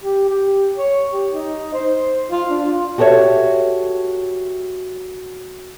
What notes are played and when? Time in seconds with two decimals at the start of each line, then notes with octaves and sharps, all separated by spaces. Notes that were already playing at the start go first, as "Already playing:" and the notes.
0.02 G4
0.29 G4
0.77 C#5
1.12 G4
1.31 D#4
1.73 C5
2.31 F4
2.50 D4
2.65 F4
2.98 F#4 G4 A4 B4 C#5 E5